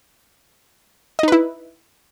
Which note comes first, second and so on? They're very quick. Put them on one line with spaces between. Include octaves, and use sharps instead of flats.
D#5 D#4 B4 E4